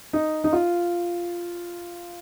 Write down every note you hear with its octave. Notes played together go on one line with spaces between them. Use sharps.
D#4
D#4
F4